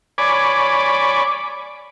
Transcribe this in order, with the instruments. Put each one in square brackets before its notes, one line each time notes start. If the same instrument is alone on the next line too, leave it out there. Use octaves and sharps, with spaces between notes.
[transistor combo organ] C#5 D5 G#5 B5 D6